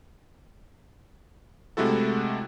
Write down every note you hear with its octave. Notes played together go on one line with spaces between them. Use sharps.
C3 G#3 A3 E4 F#4 A4